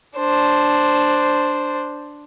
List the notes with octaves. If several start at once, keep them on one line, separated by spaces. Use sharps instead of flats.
D4 C5